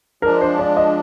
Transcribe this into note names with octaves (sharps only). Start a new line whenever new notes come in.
F3 G#3 D4 A#4
C5
D5
D#5